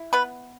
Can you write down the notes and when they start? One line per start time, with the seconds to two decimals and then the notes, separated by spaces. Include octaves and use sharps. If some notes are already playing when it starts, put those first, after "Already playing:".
Already playing: E4
0.13 B3 B4